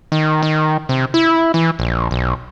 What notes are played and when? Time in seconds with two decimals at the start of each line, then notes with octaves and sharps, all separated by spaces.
0.12 D#3
0.43 D#3
0.89 C3
1.14 E4
1.54 E3
1.79 A#1
2.11 B1